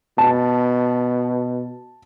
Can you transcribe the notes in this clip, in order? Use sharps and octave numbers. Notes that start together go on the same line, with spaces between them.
B2 A5